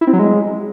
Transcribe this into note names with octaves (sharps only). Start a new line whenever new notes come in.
E4
C4
F#3
G#3